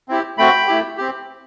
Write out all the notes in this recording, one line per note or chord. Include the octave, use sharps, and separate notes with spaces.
C4 E4 G4
A3 C4 F#4 G5 B5
A3 E4 G4
C4 G4